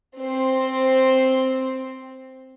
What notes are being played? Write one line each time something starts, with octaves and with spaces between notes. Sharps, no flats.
C4 C5